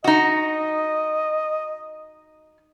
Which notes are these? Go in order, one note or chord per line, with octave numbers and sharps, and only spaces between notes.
D#4 F#4 D#5